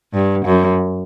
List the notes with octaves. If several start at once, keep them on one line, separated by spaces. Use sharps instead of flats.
G2
F#2